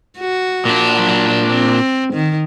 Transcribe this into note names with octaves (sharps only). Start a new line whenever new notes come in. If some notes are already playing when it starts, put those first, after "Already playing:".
F#4
A#2 D4
F#3
C4
D#3